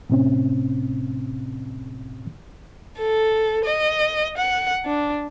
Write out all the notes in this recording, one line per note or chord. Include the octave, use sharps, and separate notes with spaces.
A2 C3 C4 C#4
A4
D#5
F#5
D4